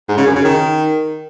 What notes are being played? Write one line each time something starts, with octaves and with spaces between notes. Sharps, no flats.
G#2
C#3
F#2
C#3
D#3